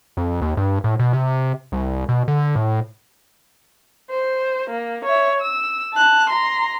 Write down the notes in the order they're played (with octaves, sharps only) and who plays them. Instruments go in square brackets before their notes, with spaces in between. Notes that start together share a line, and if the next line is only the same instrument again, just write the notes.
[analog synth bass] F2
D#2
G2
A2
B2
C3
C2
B2
D3
A2
[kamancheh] C5
A#3
C#5 E5
E6
A5 F#6
A#5 C6